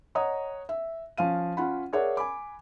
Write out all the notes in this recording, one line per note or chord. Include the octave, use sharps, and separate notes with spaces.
C#5 D#5 F#5 A#5 D#6
E5
F3 C#4 F5 D#7
C#4 F4 F#5 B5
G#4 A#4 C#5 D5 E5 F#5
G#5 B5 D6